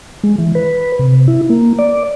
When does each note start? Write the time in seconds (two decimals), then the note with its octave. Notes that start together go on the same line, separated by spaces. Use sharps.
0.24 G#3
0.38 E3
0.55 B4
0.99 C3
1.28 E4
1.50 A#3
1.79 D5